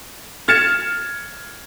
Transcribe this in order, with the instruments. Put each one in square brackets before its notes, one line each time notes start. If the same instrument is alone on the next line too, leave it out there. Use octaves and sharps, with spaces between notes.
[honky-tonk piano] F6 G#6 A6 C#7 E7